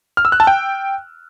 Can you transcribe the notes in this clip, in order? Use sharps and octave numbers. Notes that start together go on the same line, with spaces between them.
F6
E6
F#6
A5
G5